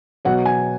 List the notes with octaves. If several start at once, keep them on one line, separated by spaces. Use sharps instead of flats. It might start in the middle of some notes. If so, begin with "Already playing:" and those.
B2 F#3 F#5
G#5